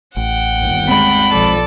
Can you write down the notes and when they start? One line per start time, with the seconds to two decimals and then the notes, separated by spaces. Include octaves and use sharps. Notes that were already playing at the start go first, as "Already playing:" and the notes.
0.17 A1 F#5 G5
0.54 G1 D#2
0.89 G#3 A3 C4 B5
1.32 B1 F3 A4 D5